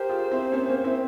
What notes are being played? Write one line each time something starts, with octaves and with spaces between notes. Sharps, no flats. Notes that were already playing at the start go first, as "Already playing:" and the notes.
Already playing: G4 A#4 C5
F4 G#4
C4 E4
A#3 C#4
A#3 C#4
C4 E4